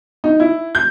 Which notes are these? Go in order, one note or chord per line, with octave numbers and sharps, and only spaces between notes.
D#4
E4
G6